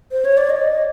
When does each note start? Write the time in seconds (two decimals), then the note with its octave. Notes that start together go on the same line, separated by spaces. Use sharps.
0.11 C5
0.25 C#5
0.37 D5
0.50 D#5